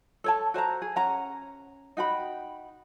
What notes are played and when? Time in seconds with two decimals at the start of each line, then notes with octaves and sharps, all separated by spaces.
0.24 A4 C#5 A5
0.54 F#4 C5 A5 A#5
0.82 G#4
0.96 C#4 F#5 A#5
1.97 D#4 F#4 G5 B5